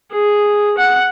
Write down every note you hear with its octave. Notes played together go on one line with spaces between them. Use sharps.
G#4
F#5